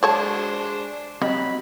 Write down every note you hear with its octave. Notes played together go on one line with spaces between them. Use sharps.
F#3 G#3 D4 C5 C#5 A5
F#3 G3 C4 D#5 B5